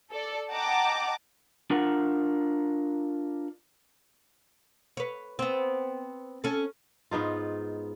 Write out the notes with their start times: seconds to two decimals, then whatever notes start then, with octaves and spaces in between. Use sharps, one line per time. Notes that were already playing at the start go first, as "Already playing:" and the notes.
0.12 A4 D5
0.51 D#5 F#5 G5 A5 A#5 D6
1.70 D4 F4 A#4 F#5
4.97 B4 C#5
5.39 B3 C4
6.44 C#4 A4
7.11 G#2 B3 D#4 F4